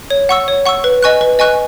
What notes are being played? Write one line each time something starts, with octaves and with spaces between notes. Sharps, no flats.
C#5
F#5 C#6 E6
C#5
F#5 C#6 E6
B4
D#5 G#5 C#6 F#6
B4
D#5 G#5 C#6 F#6